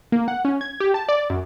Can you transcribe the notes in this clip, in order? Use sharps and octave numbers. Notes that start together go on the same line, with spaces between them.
A#3
F#5
C#4
G#6
G4
A5
D5
F#2